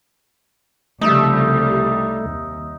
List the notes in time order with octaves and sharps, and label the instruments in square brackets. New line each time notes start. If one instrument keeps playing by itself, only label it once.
[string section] C2 G3 [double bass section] C#3 F3 [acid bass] A3 [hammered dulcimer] D#4 E5
[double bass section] D#2